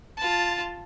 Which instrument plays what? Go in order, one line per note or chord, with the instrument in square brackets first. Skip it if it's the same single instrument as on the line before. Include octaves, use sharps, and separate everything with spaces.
[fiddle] F4 A5